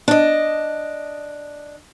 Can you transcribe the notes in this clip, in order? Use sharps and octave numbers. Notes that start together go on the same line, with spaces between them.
D4 D#5